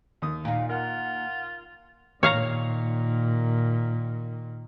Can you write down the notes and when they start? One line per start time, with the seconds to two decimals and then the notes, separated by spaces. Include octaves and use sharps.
0.22 D#2 D#6
0.45 A#2 D#4 F5
0.69 F4 A#4 F#5
2.23 A#2 D#3 C#5 F5 A#5